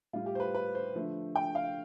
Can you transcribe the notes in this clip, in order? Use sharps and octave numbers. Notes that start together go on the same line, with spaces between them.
A2 G3 F4
G4
C5
B4
B4
C5
D3 F3 A3
G5
F5